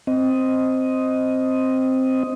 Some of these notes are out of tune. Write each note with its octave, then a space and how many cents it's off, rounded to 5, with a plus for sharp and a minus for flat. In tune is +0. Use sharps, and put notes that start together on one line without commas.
C4 +0 D#5 +5